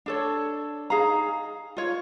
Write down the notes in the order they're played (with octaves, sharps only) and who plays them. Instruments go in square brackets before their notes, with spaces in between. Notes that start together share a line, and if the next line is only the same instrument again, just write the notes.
[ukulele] D4 A4 C#5
D#4 G#4 F5 A#5
F4 C#5